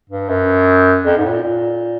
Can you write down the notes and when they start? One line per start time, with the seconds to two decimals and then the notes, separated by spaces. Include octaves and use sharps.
0.10 G2
0.29 F#2
1.05 F2
1.17 G#2
1.25 A2
1.30 A#2
1.42 A#2